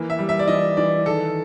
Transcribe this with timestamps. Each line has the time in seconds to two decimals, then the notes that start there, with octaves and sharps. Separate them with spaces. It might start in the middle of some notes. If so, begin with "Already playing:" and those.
Already playing: E3 A#3
0.10 E5
0.19 G3
0.29 E5
0.39 D5
0.48 E3 D#5
0.77 E3 D5
1.06 D#3 A4